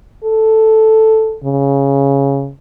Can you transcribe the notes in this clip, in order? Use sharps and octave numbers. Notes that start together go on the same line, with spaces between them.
A4
C#3